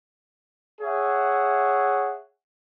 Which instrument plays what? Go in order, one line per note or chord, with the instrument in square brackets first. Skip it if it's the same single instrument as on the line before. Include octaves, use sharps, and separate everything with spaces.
[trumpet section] G#4 C#5 E5 F#5